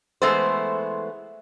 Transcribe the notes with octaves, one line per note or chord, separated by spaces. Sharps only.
E3 G#3 A3 B3 C5